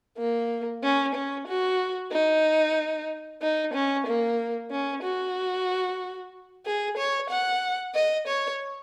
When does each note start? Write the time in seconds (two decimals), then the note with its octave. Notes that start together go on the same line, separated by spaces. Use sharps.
0.18 A#3
0.83 C#4
1.15 C#4
1.48 F#4
2.12 D#4
3.42 D#4
3.74 C#4
4.07 A#3
4.71 C#4
5.03 F#4
6.66 G#4
6.97 C#5
7.30 F#5
7.95 D#5
8.27 C#5